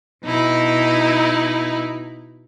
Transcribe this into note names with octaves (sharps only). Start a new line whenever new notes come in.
B2 D#4 E4